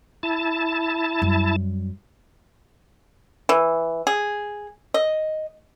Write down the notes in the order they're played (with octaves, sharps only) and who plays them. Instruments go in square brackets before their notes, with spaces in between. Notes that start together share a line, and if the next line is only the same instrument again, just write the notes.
[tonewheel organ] E4 A5
[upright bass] F#2 G3
[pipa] E3
G#4
D#5